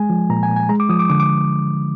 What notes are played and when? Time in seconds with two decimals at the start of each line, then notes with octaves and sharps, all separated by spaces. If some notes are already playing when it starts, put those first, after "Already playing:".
Already playing: G#3 G#5
0.10 F3
0.30 A#2 A#5
0.43 G#5
0.49 A#2
0.56 G#5
0.69 G#3 A#5
0.80 D6
0.89 F3 D#6
0.99 D6
1.10 D3 D6
1.20 D6